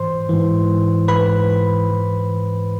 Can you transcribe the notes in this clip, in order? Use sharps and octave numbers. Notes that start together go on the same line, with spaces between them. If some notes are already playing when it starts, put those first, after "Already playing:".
Already playing: G#2 E3 C5 C6
G#2 E3
G#2 E3 B4 B5
G#2 E3